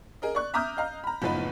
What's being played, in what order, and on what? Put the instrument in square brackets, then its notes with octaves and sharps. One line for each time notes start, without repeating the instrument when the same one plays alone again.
[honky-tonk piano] G#4 A#4 D#5
D5 C#6 F#6
E5 A#5 D6 D#6 F6 G6
D#5 F5 A#5
A#5 B5
F#1 A2 F3 B3 D#4 B4